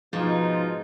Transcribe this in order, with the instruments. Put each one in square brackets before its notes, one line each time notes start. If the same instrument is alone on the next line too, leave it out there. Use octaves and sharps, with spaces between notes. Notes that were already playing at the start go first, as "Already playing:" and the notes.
[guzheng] G#2 [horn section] B2 D#4 F4 [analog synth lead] F3